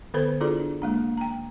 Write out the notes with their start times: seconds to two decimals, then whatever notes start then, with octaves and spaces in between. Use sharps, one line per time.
0.14 D3 B3 A4 B4 C5 B5
0.41 D4 E4 F4 G#4 A4 D5
0.60 D4
0.82 G#3 A#3 D4
1.17 G5 A#5